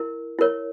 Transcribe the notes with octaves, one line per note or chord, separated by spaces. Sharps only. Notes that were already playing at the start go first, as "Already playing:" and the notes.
Already playing: E4 A#4
E4 A#4 C#5